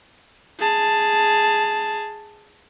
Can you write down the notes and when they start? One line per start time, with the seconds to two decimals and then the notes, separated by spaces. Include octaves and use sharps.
0.60 G#4 A5